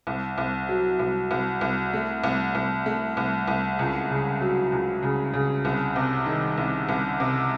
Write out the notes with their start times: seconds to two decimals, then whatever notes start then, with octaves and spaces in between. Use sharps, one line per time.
0.07 C2
0.38 C2
0.69 F#3
0.99 C2
1.31 C2
1.61 C2
1.93 A3
2.24 C2
2.55 C2
2.86 A3
3.17 C2
3.48 C2
3.79 C#2
4.10 C#3
4.41 F#3
4.72 C#2
5.03 C#3
5.34 C#3
5.65 C2
5.96 C3
6.26 D#3
6.57 C2
6.89 C2
7.20 C3